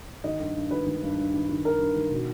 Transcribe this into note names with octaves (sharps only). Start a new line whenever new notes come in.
D#3 D#5
G2
G2
D#3 B4
D#3
G2
G2
D#3
D#3
G2 A#4
G2
D#3
B2